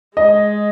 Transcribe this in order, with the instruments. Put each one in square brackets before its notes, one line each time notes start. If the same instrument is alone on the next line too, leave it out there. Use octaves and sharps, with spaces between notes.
[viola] G#3 [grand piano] D#5